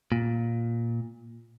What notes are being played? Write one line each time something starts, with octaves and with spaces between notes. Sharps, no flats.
A#2